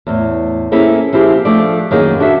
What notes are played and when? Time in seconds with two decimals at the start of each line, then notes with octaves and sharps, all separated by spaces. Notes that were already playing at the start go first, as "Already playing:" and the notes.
0.07 E2 A2
0.72 A#3 C4 C#4 E4 G#4 A4
1.13 F3 C4 E4 G4 G#4
1.45 F3 A3 D4 F4 D5
1.91 F#2 D#3 A#3 D#4 G#4
2.20 D4 F#4 A4 E5